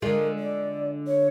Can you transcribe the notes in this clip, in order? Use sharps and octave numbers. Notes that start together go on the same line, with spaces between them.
D3 G#3 F4 A#4
D5
C#5